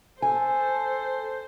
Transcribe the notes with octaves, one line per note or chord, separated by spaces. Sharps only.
A4 C5 G#5